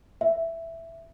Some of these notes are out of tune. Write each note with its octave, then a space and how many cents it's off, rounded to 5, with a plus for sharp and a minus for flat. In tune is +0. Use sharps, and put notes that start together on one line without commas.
E5 +5